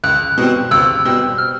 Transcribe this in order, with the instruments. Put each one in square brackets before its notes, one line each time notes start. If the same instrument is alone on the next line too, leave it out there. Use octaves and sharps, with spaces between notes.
[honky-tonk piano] C#2 [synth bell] F#6
[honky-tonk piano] B2 G3 C4
[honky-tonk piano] C#2 [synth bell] E6
[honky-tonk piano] B2 G3 C4
[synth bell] F6